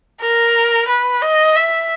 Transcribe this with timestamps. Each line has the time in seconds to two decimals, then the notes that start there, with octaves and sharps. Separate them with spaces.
0.21 A#4
0.88 B4
1.22 D#5
1.56 E5